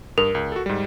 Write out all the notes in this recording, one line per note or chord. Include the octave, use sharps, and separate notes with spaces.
G2 A#4
C#2
F#4 A4
G#2 G3